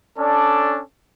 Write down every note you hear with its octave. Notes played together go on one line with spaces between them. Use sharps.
C#4 D4 A4 D5